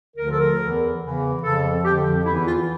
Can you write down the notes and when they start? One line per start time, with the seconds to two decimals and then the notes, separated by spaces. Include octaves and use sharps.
0.17 D2 D3 F3 A#4
0.29 A4
0.39 A#4
0.58 E2 E3
1.01 E2 C#3 E3
1.42 F2 C#3 F3 A4
1.83 F2 D3 F3 G4
2.25 E2 E3 E4
2.46 F4